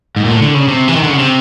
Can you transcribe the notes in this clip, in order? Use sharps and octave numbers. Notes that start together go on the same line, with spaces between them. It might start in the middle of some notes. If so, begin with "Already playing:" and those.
G#2
A#2
A2
D3
C#3
C3
E3
D#3
D3
C#3
C3